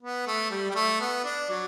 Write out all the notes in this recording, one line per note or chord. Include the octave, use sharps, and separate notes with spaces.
B3
A3
G3
G3
A3
B3
D4
F#3